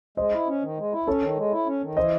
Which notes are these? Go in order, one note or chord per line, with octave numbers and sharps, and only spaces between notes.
G#3 C5 D#5
E4
C#4
D#3
G#3
E4
C#4 A4 C#5
D#3
G#3
E4
C#4
D#3
E3 C5 D#5